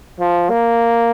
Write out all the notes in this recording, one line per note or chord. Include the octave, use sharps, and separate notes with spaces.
F3
A#3